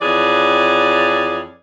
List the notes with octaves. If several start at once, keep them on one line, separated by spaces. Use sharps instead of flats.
F2 E3 G#4 C#5 D5